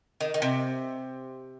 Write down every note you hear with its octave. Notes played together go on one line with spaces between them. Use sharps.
D#3
D#3
C3